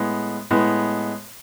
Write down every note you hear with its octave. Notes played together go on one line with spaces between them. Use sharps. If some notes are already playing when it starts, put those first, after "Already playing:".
Already playing: A2 G#3 B3
A2 G#3 B3